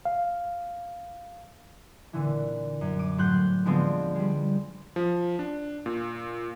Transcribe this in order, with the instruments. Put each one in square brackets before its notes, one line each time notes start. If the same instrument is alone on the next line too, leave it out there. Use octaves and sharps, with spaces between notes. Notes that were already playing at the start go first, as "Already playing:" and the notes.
[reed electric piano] F5
[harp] A#2 D3 E3
F#2
D6 D#7
A2 F#3 C5 C6 F#6 G6
D3 F3 G#3 B3 C4 F4
G3 G#3
[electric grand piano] F3
D4
A#2